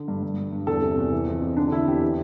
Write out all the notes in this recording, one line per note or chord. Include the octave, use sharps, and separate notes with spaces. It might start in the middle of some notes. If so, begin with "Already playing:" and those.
Already playing: D3
G2
G2
G2
G2
E2 A4
C3
E2
E3
F2
F2
D3 D4
D4
D3 E4
E2 G4
E3